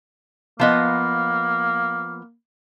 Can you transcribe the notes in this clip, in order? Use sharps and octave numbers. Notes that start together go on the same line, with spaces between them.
F3 A#3 B3 D#5